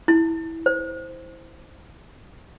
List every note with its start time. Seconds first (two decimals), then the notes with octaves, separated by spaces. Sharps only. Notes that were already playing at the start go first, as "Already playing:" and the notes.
0.08 E4
0.66 C5